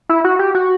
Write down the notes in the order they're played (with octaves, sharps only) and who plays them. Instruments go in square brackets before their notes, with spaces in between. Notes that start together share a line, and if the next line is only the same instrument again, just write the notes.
[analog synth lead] E4
F#4
G4
F#4